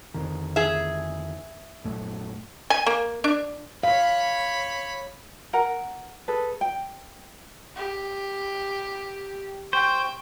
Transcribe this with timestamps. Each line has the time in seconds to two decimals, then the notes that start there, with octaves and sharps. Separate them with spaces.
0.14 F2 D3 D#3
0.56 G#4 E5
1.84 A#1 F#2 A3
2.70 G#5
2.86 A#3
3.24 D4
3.83 C#5 F5 B5
5.53 A#4 F#5 A#5
6.28 G#4 A4 B4
6.61 G5
7.76 G4
9.73 C5 G5 C#6